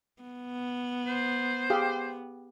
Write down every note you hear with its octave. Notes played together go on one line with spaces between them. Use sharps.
B3
C5
G4 G#4 F5